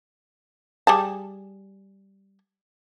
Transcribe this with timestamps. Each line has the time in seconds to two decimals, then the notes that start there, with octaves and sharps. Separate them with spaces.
0.87 G3 G#4 A5